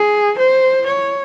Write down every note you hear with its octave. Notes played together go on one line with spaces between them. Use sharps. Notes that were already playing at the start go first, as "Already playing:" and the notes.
Already playing: G#4
C5
C#5